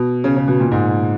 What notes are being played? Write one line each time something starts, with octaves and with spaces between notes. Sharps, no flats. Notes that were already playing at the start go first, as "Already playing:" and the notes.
Already playing: B2
C#3
C#3
B2
A#2
G#2